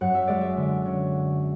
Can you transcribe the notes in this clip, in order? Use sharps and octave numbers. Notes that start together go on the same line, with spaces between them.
F#2 F#5
E5
G#3 D5
E5
D3
C#4